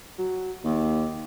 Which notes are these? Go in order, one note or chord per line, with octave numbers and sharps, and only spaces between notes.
F#3
D#2